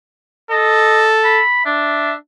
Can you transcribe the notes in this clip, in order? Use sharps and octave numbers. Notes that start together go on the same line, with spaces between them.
A4 D#5
B5
D4 E5